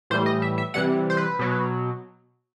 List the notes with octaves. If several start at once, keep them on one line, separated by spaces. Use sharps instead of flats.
A2 E3 G3 C5
D#5
E5
E5
C3 E3 G3 F#5
C5
B4
B2 F#3